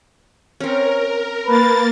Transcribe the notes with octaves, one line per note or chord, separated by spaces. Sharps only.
C4 C#4 A#4
A#3 A#4 B4 A6